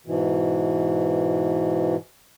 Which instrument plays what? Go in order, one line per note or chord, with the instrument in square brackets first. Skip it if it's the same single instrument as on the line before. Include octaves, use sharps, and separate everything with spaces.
[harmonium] G#2 B2 E3